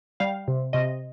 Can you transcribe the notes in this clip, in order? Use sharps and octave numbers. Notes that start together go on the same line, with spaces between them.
G3 F5
C3
C3 D#5